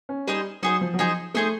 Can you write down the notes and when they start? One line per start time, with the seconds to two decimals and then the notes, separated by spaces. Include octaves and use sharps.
0.09 C#4
0.27 G3 D#4 G#4 C5
0.62 F#3 D#4 G#4 C5
0.81 F3
0.94 F#3
0.99 F3 D#4 G#4 C5
1.34 A3 D#4 G#4 C5